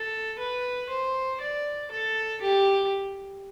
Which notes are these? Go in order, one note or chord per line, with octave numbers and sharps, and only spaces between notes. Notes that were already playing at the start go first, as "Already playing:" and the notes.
Already playing: A4
B4
C5
D5
A4
G4